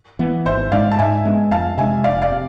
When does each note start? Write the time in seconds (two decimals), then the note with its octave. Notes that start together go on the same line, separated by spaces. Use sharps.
0.19 E3 B3
0.45 G#1 C5 E5
0.72 G#2 G#3 D4 D5 F5
0.91 A5
0.99 G#2 E5 G#5
1.25 G#3 B3 D4
1.51 F2 F5 A5
1.78 C3 G#3 D4 E5 G#5
2.04 F1 D5 F5
2.22 D5 F5
2.31 C3